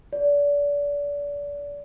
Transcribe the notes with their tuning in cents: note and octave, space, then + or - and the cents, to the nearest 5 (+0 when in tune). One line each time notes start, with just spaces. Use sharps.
D5 -30